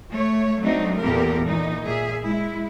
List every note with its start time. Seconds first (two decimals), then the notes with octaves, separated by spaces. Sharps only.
0.11 A3 C#5
0.61 F#3 A3 C4 D4 D#4
1.01 E2 A#2 B3 G4 A4 A#4
1.47 A#2 E3 D#4
1.84 A#2 G#4 E5
2.22 G#3 E4